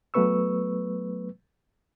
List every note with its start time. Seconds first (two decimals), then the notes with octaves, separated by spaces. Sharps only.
0.14 F#3 A3 B3 B4 C#6 E6